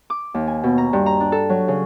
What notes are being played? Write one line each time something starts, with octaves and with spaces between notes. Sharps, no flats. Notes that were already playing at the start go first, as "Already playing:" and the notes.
D6
D#2
G#5
B2
A#5
G2
A#5
D4
A4
F#3
C#3